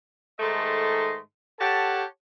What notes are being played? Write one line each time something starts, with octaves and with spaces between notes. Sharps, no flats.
G#2 D#3 A3 A4 D#5 C6
G4 A4 C#5 F#5 A5